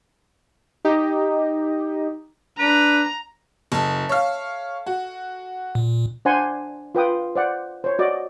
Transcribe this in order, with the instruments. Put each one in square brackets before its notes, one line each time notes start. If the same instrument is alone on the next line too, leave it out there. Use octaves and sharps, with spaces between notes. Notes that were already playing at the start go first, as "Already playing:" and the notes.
[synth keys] D#4 G4 D#5
[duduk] D4 [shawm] B4 [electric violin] A#5
[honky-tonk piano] F#1 [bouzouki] A4 E5
[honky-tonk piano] C#5 F5
F#4
[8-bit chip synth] A#2
[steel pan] D4 C5 F#5 G#5 C6
F4 B4 G5 D#6
C5 D5 F#5
C5 C#5
F#4 D5 D#5